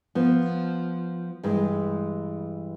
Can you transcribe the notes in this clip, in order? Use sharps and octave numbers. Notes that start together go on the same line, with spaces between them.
F3 B3
G2 E3 G#3